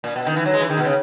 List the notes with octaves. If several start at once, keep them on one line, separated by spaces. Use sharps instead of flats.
A#2
B2
D#3
E3
F#3
G#3
E3
D#3
B2
C#3